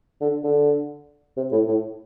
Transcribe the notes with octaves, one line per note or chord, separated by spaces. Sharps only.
D3
D3
C3
A2
A2